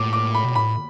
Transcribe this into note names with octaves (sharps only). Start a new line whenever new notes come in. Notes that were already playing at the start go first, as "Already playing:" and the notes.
Already playing: A2 D6
D6
B5
B2
A2 B5